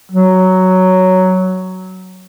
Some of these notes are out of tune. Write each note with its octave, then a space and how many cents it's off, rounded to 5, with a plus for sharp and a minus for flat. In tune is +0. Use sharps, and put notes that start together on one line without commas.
F#3 +5